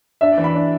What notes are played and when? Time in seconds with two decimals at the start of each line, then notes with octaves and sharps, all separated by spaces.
0.21 D4 E5
0.32 D5
0.38 E3
0.44 B5
0.54 D4